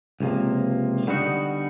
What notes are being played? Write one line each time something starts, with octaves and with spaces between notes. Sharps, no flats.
C#2 C3 F3 A#3
D3 G3 B3 D#4 F#4